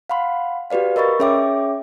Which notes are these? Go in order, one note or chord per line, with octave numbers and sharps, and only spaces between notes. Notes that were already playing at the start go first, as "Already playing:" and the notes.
F5 F#5 B5 C6
F#4 G4 B4 D5 F5
A#4 D#5 B5 C#6 A6
C#4 G#4 C#5 E5 G5 D6